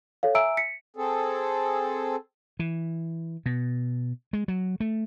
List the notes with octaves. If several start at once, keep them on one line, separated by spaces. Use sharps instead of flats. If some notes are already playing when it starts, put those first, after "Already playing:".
A4 C#5 F5
E5 G#5 A#5 E6 D7
B6 C#7
C4 G#4 A4
E3
B2
G#3
F#3
A3